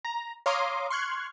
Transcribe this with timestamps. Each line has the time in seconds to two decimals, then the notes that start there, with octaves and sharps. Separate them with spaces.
0.05 A#5
0.46 C#5 F5 A#5 C6 D6 D#6
0.90 C6 C#6 F6 F#6 G#6